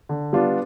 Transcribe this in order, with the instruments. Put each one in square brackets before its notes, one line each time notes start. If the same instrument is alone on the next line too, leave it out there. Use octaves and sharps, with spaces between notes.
[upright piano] D3
G3 B3 D4 F4